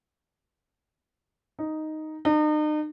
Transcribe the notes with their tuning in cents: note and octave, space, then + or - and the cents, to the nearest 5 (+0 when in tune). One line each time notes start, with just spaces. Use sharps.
D#4 +0
D#4 -40